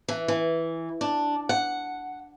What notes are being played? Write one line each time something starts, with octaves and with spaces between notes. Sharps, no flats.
E3
E3
D4
F#5